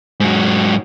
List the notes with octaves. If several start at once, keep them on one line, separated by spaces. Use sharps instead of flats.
G#2 F#3